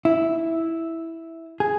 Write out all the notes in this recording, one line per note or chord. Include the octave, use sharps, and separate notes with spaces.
E4
G#4